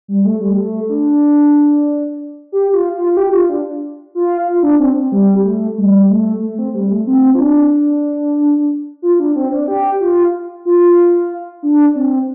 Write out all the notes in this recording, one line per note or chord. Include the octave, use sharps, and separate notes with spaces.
G3
A3
G3
A3
D4
G4
F4
F4
F4
G4
F4
D4
F4
F4
D4
C4
C4
G3
A3
G3
A3
A3
C4
G3
A3
C4
F4
D4
F4
D4
C4
D4
G4
F4
F4
D4
C4